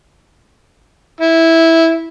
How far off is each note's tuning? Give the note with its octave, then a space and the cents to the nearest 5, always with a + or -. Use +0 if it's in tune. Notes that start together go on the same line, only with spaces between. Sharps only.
E4 -10